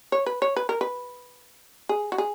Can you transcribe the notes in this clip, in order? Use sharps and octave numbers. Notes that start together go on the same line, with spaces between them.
C#5
B4
C#5
B4
A#4
B4
G#4
F#4
G#4